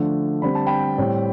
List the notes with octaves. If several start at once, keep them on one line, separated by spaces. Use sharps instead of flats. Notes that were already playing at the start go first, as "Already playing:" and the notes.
Already playing: D3 F3 A3 D4
D3 G3 C4 B5
A5
G5 B5
A2 G3 C4